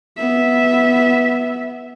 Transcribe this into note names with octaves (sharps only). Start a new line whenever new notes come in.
B3 E5